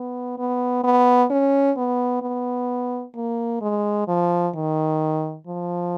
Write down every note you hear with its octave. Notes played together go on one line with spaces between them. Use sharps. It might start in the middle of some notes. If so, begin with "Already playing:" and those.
Already playing: B3
B3
B3
C#4
B3
B3
A#3
G#3
F3
D#3
F3